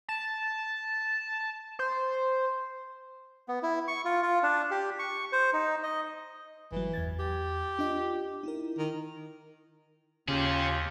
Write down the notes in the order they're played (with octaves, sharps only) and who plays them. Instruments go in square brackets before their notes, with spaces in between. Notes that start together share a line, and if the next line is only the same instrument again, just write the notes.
[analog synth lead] A5
C5
[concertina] B3
E4
C#6
F4
F4
D4
G4
C#6
C5
D#4
D#5
[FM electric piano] G1 F#3 [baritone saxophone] E3
[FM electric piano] E2 G#6 A6
[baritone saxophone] G4
[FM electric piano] D4 F4 D#5
D#4 E4 A#4
[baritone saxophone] D#3
[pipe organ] D#2 [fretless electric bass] C#3 [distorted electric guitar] C#4 G#4 [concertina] F4 G4